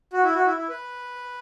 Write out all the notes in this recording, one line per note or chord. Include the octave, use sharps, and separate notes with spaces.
F#4
E4
F#4
E4
E4
B4